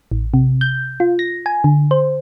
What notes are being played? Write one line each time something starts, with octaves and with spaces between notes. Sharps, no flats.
A1
C3
G6
F4
A#6
G#5
D3
C5